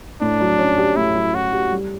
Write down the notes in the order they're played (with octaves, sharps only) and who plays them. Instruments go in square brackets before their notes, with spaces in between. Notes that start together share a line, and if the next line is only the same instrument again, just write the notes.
[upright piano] A2 [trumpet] D4
[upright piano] F#3
C#4
G4
[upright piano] A2 [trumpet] E4
[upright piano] F#3
[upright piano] C#4 [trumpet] F#4
[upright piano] G4
G3